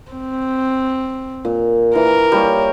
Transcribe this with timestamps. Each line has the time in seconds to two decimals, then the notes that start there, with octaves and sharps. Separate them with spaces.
0.12 C4
1.45 A#2
1.95 E3 A#4
2.32 G3 A#3 C#5